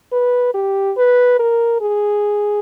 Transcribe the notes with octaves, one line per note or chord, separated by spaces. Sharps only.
B4
G4
B4
A#4
G#4